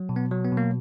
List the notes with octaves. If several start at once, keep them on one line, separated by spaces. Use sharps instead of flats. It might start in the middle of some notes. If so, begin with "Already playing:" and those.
Already playing: F#3
B2
B3
F#3
B3
B2 A#3